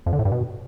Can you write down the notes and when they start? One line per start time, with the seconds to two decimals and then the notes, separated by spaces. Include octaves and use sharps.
0.06 F2
0.13 D3
0.19 A2
0.25 G2
0.32 B2